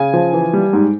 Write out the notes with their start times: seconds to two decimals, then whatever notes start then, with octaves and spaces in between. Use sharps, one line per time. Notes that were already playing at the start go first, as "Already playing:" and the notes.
Already playing: C#3 G#5
0.13 F3
0.33 E3
0.53 G3
0.73 G#2